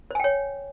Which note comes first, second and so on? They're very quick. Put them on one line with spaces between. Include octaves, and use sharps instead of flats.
C5 G#5 G5 C#5